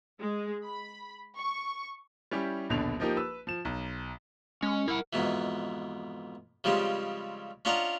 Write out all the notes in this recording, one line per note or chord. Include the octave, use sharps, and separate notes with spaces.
G#3
B5
C#6
G3 C#4 E4 G4
D#1 A#1 B2 D3 F7
F3 A#3 D#4 G4 A#4
B4 E6
F3 E7
B1
G#3 C#4
E4 A#4 F#5
F2 G#2 B2 E3
C#3 F3 G3 G#3 C4
C#4 D4 F4 D#5 F#5 A#5